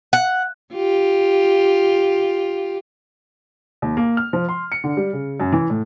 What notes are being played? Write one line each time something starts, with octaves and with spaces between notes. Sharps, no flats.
F#5
F4 G4
D#2
A#3
F6
F3
C6
C#7
D3
G3
C#3
F#2
E3
A2